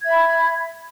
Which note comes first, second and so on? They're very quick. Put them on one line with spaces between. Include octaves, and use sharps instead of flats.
G#6 E5 B5